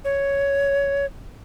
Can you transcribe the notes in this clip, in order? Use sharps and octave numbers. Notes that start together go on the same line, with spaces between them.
C#5